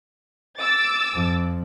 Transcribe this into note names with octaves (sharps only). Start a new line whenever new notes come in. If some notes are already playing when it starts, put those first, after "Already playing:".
D6 E6 A6
F2